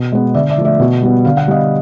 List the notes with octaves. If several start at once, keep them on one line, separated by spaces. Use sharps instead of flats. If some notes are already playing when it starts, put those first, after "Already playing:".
Already playing: B2
G#3 B3
D3 D5 E5
D5 E5
F3 A3
D5 E5
B2
G3 B3
D3 F5
F#5
G3 B3 D#5 F5